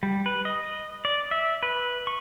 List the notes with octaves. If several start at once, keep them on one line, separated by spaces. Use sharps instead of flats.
G3
B4
D#5
D5
E5
B4
C#6